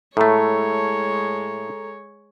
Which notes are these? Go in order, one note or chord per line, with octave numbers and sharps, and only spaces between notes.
A2 G#3 A3 A4 C#5 A#5